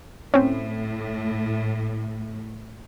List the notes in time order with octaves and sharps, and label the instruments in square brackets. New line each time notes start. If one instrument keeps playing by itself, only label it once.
[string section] A2 [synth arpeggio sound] C4 C#4